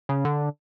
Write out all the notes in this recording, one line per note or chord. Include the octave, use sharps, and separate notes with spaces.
C#3
D3